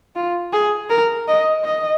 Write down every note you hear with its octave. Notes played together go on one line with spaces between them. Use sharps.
F4
G#4
A#4
D#5
D#5